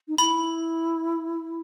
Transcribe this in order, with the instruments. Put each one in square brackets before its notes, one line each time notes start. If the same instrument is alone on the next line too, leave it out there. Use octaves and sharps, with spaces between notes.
[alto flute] D#4
[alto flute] E4 [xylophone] B5